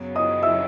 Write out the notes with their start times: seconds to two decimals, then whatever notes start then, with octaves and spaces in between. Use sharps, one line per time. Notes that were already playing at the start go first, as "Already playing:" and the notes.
Already playing: F#2 C#3 F#3 B3
0.16 D#5 D#6
0.43 E5 E6